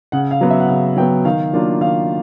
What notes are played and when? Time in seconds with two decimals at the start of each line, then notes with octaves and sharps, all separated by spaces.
0.12 C#3 F#5
0.31 F5
0.41 F#3 B3
0.50 E5
0.60 F#5
0.68 C#3 F5
0.97 F#3 B3 G5
1.25 D#3 F5
1.53 F#3 A#3 D4 F4
1.81 D#3 F5